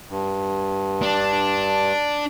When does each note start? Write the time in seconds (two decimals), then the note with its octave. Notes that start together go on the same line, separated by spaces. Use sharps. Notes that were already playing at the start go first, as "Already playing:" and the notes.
0.10 G2
1.03 D4